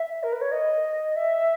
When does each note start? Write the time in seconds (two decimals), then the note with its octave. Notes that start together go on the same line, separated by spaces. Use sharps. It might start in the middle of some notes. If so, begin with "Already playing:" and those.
Already playing: E5
0.23 A#4
0.33 B4
0.41 C#5
0.51 D#5
1.16 E5